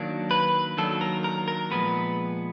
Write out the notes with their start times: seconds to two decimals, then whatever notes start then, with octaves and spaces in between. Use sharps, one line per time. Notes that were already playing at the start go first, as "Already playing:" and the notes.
Already playing: D#3 F#3 A#3 D4
0.31 B4
0.77 D#3 F#3 A#3 D4 A4
1.01 A#4
1.24 A#4
1.48 A#4
1.71 A#2 F3 G#3 B3 B4